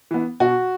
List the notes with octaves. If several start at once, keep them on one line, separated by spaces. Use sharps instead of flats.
E3 B3
B2 F#4